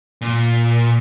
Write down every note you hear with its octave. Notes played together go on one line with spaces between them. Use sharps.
A#2